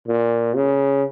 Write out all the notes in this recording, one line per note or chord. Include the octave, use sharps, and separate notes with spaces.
A#2
C#3